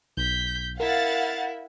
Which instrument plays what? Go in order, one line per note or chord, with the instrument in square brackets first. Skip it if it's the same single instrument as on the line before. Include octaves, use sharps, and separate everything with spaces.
[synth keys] B1 [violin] G6 B6
[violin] E4 [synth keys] A#4 [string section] F5 F#5 A6